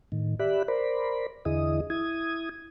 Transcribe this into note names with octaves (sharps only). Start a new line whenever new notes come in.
A2 D#3
G4 D5 E5 B5 F#6
A#4 C5 D5 B5
E2 D3 E4 G#4 D#5 D#6
E4 D#6 G#6